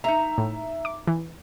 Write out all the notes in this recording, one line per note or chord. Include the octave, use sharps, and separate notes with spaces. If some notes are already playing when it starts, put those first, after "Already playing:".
D#4 E5 A#5
A2
D6
E3